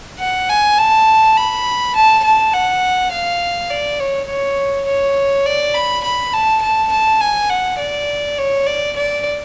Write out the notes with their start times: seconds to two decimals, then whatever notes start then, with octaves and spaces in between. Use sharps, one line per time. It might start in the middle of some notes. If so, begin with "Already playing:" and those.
0.19 F#5
0.49 G#5
0.78 A5
1.37 B5
1.95 A5
2.24 A5
2.53 F#5
3.12 F5
3.70 D5
4.00 C#5
4.28 C#5
4.87 C#5
5.46 D5
5.74 B5
6.03 B5
6.33 A5
6.62 A5
6.92 A5
7.21 G#5
7.50 F#5
7.79 D5
8.38 C#5
8.66 D5
8.96 D5